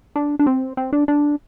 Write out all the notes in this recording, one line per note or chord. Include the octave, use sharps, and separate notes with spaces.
D4
D4
C4
C4
D4
D4